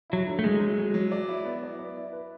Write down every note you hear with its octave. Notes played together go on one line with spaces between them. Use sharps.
F#3 E4
D3
A3
F#3 G#3
F#3
F#3
F#3
D5
E4
B3
D5
B4
E4
B4